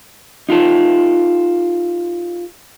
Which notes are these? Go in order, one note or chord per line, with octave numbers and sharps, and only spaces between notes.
D#4 F4 G4 A4